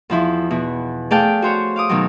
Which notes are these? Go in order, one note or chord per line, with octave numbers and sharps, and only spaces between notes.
E2 F3 E4
B2 E4
A3 G#4 D5 F5 G5 A5
F#4 C5 C#5
F5 D6 D#6
B2 D#3 F#3